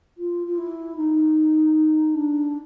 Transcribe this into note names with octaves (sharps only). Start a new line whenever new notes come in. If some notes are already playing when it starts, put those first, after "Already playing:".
F4
F4
E4
D#4
D4